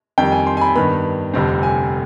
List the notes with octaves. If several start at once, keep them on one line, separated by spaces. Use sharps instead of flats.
F2 D#3 G3 G5
G#5
C6
G#5
B5
G2 D#3 B3 B5
F1 F2 D3 G3 C4
G#5